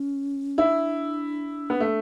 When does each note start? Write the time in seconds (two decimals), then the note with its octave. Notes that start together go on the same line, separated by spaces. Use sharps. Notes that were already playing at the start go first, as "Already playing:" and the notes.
Already playing: C#4
0.58 D4 E4
1.70 B3
1.80 A3